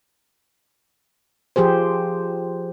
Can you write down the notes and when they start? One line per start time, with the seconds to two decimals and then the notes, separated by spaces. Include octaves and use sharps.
1.56 F3 G4 G#4 C5